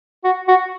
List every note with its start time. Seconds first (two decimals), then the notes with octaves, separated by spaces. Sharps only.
0.24 F#4
0.48 F#4